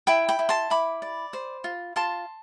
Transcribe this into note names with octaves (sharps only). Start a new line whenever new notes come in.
E4 G5 B5
G5 B5
E4
A5 C6
E4 B5 D6
D5
C5
F4
F4 A5 C6